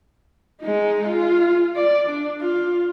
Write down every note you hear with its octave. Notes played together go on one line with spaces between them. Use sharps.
G#3 D#4
F4
D5
D4
F4